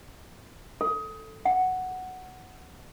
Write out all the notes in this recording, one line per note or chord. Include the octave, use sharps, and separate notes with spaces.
A4
F#5